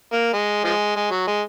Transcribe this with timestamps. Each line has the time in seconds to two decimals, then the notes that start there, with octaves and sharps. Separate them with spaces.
0.12 A#3
0.33 G#3
0.64 F3 G#3
0.96 G#3
1.11 F#3
1.27 G#3